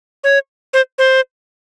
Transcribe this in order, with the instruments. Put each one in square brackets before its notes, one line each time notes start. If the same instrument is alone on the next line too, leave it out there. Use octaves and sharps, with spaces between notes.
[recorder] C#5
C5
C5